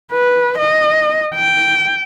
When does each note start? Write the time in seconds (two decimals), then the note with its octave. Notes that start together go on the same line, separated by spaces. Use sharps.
0.12 B4
0.58 D#5
1.35 G5